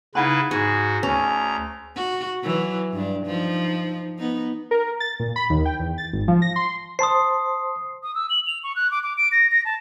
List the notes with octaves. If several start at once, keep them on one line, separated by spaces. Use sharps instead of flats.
C#3 D#4 E4 B4 F#5 B5
G#2 F#4 G#4
D2 C#4 A#5
F#4
E3 F#3
G2 D4
F3 D#4
B3 D#4
A#4
A6
A#2
B5
D#2
G5
E2
A6
G#1
F3
A#6
C6
C5 A5 C6 D#6 C7
D#6
E6
F#7
F7
C#6
F#6
D6
D6
D7
A#6
A#6
A5